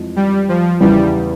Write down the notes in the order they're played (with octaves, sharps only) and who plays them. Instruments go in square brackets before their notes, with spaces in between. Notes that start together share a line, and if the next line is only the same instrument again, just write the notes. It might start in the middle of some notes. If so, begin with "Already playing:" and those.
Already playing: [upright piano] F2 E3 G#3
[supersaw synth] G3
F3
[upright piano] E2 C#3 E3 [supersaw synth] G3